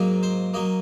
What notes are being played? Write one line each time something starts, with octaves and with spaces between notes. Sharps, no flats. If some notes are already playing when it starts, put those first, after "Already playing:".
Already playing: G#2 F#3 A#3
C5
F#3 A#3 D#5